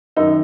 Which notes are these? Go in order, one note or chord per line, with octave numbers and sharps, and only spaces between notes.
F#2 D#3 D#4